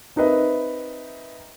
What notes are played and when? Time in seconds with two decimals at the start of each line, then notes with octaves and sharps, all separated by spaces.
0.16 C4 D#4 A#4 B4 D#5 E5